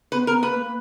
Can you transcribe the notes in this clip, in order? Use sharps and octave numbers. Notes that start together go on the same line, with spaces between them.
B3 B4
B3 A#4
A#3 B4
A#3